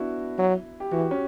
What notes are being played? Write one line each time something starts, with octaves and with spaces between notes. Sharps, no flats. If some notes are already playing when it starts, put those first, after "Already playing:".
Already playing: B3 D4 E4 F#4
F#3
G4
E3 F#4
C#4